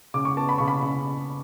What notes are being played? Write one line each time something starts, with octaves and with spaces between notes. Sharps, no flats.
C#3 D6
C#6
B3 A5
B5
C#3 C#6
B5
C#3